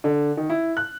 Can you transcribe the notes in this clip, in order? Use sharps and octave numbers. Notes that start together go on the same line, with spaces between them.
D3
D#3
E4
F#6